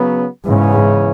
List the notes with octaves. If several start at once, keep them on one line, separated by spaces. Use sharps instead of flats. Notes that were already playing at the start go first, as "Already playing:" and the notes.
Already playing: C#3 F#3 B3
E2 G#2 C#3 E3 C#4